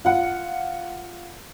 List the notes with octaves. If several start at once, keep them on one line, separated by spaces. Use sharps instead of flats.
F4 F#5